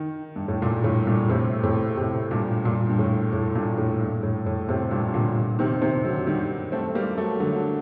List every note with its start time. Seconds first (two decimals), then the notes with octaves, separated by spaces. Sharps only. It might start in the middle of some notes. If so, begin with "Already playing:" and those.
Already playing: D#3
0.36 G2
0.48 A2
0.62 G2 A#2
0.84 A2
1.07 G2 A#2
1.29 A2 C3
1.63 A2 C3
1.97 A2 C3
2.31 G2 A#2
2.65 G2 A#2
2.89 G2
2.99 A2
3.33 A2
3.55 G2 A#2
3.78 A2
4.01 G2
4.23 A2
4.46 A2
4.69 A2 C3
4.91 G2 A#2
5.14 A#2 D3
5.59 C3 D#3
5.82 C3 D#3
6.04 D3 F#3
6.27 D#3 G3
6.72 A3 C4
6.95 G3 A#3
7.17 F#3 A3
7.40 D3 F#3